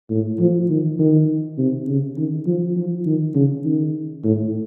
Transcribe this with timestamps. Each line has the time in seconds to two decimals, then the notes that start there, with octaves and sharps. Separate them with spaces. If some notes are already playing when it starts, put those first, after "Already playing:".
0.10 A2
0.40 F3
0.70 D#3
0.99 D#3
1.58 C3
1.88 C#3
2.17 D#3
2.46 F3
2.76 F3
3.06 D#3
3.35 C#3
3.65 D#3
4.24 A2